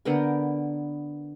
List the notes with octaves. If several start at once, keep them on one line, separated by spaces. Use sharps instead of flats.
D3 B3 A#4 G5